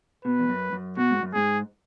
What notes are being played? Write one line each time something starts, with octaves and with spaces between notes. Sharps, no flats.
B2 B4
E2
F#2
F#2
B2 F#4
G#2
F#2
G#2 G#4